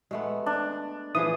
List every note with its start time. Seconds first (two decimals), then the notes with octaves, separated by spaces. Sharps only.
0.11 G#3 A3 B3
0.46 D4
1.15 E3 F3 G#4 D#6